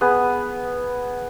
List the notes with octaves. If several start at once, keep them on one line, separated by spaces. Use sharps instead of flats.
B3 G#4